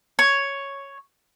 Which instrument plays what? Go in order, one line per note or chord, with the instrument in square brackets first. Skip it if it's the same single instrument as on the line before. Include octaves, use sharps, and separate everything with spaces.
[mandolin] C#5